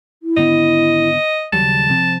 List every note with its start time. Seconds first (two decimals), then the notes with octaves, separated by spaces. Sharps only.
0.23 E4
0.37 G#1 D3 B3 D#5
1.53 D#2 C#3 F#3 G3 A5
1.89 C3 F3 C4